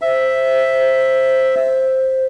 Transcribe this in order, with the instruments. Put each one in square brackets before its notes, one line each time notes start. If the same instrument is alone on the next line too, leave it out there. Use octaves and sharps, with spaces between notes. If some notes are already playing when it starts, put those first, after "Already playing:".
[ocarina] C5 [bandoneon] E5